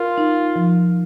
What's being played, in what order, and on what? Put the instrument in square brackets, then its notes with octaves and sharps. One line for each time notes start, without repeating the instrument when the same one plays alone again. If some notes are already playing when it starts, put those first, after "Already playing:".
Already playing: [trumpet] F4 [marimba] A#4
[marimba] D#4
F3